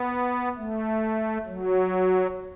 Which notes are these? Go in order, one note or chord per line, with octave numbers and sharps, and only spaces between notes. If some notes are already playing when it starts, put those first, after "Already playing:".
Already playing: B3
A3
F#3